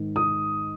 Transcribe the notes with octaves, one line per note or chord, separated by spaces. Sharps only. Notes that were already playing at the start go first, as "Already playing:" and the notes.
Already playing: G#2 D#3
D#6